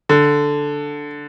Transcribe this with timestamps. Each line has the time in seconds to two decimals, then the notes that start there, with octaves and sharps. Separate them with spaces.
0.09 D3